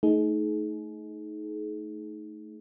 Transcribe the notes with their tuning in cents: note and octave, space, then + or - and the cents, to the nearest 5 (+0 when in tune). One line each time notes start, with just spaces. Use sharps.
A3 +5 D#4 +20 G#4 +35